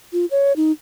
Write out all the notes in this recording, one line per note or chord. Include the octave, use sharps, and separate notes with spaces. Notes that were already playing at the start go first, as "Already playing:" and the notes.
F4
C#5
D#4